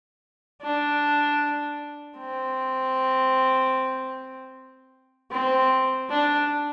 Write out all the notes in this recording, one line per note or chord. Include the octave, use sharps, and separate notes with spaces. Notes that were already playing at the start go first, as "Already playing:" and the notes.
D4
C4
C4
D4